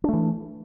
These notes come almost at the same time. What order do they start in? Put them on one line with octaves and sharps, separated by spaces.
D4 A3 E3